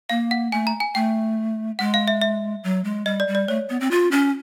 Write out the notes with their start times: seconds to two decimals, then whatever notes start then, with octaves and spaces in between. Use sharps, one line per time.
0.10 A#3 F5
0.31 F#5
0.52 A3 G#5
0.67 A#5
0.80 G#5
0.95 A3 G5
1.79 G#3 F#5
1.94 F5
2.08 E5
2.22 E5
2.64 F#3
2.84 G#3
3.06 G3 D#5
3.20 D5
3.28 G3
3.35 D5
3.48 A3 C#5
3.70 B3
3.80 C4
3.91 F4
4.11 C#4